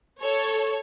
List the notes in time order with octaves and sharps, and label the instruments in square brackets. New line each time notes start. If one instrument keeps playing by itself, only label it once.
[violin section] A4 C#5